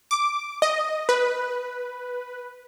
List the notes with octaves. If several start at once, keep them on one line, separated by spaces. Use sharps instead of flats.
D6
D#5
B4